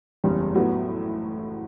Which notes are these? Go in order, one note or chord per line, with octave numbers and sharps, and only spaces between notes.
F#1 E2 C#3 G3
A2 F#3 B3 F#4